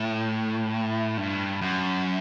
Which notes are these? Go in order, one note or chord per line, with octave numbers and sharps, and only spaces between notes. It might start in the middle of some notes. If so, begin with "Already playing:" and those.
Already playing: A2
G2
F#2